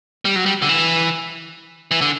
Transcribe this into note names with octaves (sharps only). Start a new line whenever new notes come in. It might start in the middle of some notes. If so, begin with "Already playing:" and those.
G3
F#3
G3
D3
E3
E3
D3